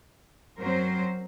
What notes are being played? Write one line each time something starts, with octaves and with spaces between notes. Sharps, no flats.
F#2 F#3 C4 A#4 C5